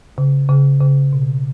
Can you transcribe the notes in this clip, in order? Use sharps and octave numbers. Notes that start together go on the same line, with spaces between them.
C#3
C#3
C#3
B2